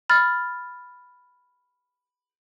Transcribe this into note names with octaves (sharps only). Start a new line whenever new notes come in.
B5 F6 A6